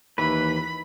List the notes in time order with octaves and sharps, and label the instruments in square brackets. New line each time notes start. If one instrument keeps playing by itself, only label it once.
[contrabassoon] D#2 [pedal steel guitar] E3 B4 [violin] B5